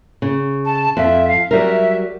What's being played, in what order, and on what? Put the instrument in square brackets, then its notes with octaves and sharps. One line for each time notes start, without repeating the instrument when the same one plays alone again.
[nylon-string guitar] C#3
[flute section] A5
[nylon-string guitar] F2 [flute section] E5
[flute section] F5
[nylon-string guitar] F#3 G3 A#4 [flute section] E5